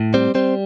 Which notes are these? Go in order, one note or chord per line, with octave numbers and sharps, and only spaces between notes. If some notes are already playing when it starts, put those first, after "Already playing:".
Already playing: A2
G3 C4 C5
G3 C4 C5